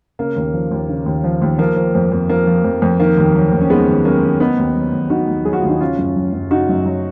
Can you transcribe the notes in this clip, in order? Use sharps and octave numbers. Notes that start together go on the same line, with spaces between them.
C#3 A#3
D#2
F3
D#2
C#3
D#2
F3
D#2
F3 A#3
F3
F2
F2
F3 A#3
F3
F2
F2
D#3 A#3
D#2
F#3
D#2
C#4
D#3 G#3 B3
D#2
F#3 A#3 C#4
D#2
D#3 B3 D#4
D#2
F#3
D#2
D#3 D#4 F#4
D#2
F#3 G#4
F#4
F4
D#2
D#4 F#4
C#3 C#4 F4
F#2
F#3
F#2
C#3 D#4 F#4
F#2
F#3